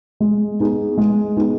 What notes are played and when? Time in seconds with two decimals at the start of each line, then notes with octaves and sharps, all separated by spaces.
0.20 G#3
0.60 B3 D#4 G#4
0.98 G#3
1.37 B3 D#4 G#4